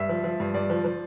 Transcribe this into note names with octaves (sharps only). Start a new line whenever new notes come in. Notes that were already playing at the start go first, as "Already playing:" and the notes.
Already playing: G2 E5
F3
F3
G2
G2 D5
F3
F3